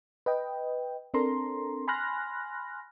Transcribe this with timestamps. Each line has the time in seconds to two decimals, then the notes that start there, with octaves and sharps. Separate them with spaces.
0.26 B4 D#5 G5
1.14 C4 D4 A4 A#4 A#5 C6
1.88 G#5 B5 C6 F6 F#6 A#6